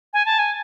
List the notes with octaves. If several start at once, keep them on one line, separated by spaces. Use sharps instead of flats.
G#5
A5
G#5